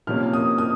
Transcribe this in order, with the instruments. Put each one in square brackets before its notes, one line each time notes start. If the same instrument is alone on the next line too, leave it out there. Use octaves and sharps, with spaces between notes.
[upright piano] C3 F3 A#3 C#4 F6
D#6
D#6